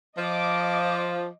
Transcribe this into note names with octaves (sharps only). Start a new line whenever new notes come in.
F3 D#5 D6